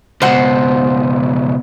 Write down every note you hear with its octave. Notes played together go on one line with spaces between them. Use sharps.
C#2 B2 C5 F#5